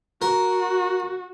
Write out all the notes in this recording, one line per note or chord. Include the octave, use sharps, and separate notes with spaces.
F#4 A#4